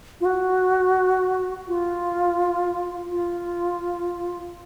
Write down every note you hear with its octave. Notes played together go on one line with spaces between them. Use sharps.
F4
F#4
F4
F4